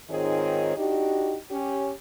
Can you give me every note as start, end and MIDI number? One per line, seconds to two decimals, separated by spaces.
0.10 0.74 44
0.10 0.74 51
0.10 0.74 60
0.10 0.74 65
0.10 0.74 68
0.10 0.74 73
0.77 1.36 62
0.77 1.36 63
0.77 1.36 66
0.77 1.36 67
1.50 1.90 61
1.50 1.90 67